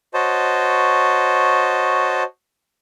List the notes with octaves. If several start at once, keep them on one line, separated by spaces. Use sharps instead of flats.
F#4 C5 C#5 D#5 A5